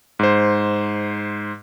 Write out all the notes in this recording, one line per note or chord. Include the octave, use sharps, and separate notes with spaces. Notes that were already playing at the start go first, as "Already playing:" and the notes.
G#2 C5